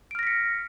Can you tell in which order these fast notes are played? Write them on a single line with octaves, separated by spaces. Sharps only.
D7 F6 A#6 B6 C#7